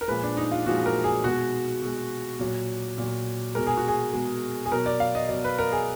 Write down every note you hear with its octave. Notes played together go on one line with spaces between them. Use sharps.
A#4
A#2 F3 G#3 B4
D4
D#4
F4
A#2 F3 G#3 F#4
A#4
G#4
B2 G#3 F#4
B2 G#3
A#2 F#3
A#2 F#3
B2 G#3 A#4
G#4
F#4
G#4
B2 G#3
G#4
B2 F#3 A#4
D5
F5
D#5
B2 F#3 D5
B4
A#4
G#4